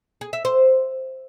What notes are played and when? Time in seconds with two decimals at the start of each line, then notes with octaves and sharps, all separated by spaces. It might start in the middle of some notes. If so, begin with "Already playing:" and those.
0.21 G#4
0.33 E5
0.45 C5